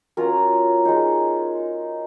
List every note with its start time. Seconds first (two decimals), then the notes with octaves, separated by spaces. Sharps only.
0.17 F#3 C#4 F4 A#4
0.85 G#3 D#4